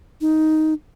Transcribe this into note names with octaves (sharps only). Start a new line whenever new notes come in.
D#4